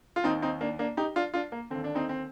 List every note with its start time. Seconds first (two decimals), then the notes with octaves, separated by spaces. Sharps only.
0.16 F4
0.24 D#2 D#3 C4 D#4
0.42 C4 D#4
0.61 A#3 D4
0.79 A#3 D4
0.97 D#4 G4
1.16 D4 F4
1.34 D4 F4
1.52 A#3
1.70 D3 C4
1.74 D#2
1.84 D4
1.95 C4 D#4
2.09 C4